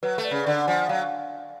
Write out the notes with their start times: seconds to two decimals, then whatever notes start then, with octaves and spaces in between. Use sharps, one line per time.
0.03 F#3 B4
0.18 A3
0.25 D5
0.31 C#3
0.46 D3 D5
0.67 F3 G#5
0.88 F#3 F5